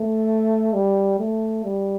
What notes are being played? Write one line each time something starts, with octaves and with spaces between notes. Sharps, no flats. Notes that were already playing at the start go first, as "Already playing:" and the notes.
Already playing: A3
G3
A3
G3